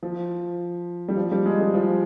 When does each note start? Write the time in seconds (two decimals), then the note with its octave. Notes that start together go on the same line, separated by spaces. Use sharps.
0.03 F3
1.09 G3
1.17 F3
1.32 G3
1.46 G#3
1.60 G3
1.74 F3